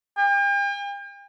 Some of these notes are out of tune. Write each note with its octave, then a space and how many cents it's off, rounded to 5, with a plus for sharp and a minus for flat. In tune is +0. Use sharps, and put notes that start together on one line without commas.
G5 +45